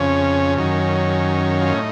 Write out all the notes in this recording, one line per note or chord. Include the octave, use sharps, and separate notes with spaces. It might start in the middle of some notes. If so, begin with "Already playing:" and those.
Already playing: F2 C#3 C#4
F#2 D#3 C#4
F4
A2 D#4